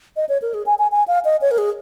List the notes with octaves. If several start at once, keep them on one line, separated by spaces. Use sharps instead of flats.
D#5
C#5
A#4
G#4
G#5
G#5
G#5
F5
D#5
C#5
A#4
G#4